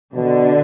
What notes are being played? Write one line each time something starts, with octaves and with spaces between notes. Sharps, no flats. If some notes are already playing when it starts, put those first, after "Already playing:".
B2 D3